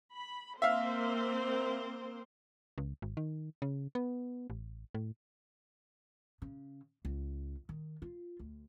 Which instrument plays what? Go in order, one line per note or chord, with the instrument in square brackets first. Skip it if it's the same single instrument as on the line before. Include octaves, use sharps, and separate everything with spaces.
[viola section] B5
[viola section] A#3 C4 C5 [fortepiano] E5 F5
[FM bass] C#2
G#1
D#3
C#3
B3
A1
A2
[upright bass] C#3
C#2
D#3
F4
D2